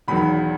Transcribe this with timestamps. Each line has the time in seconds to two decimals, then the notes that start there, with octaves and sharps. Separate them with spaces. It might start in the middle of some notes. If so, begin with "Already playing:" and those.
0.08 E1 E2 D#3 F#3 B5